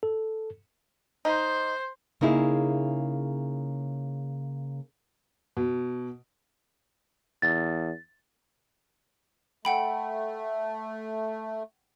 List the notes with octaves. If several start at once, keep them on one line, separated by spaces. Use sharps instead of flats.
A4
D#4 C5
C#3 A#3 D#4 E4 G#4
B2
E2 A6
A3 F#5 G5 B5